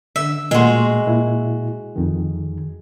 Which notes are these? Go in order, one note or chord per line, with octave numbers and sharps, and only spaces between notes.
D3 E5
A#2 G#3 A3 F#4 C6
A#2 E4
F2 D#3